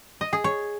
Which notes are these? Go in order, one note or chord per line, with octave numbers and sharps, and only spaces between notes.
D#5
G#4
C#5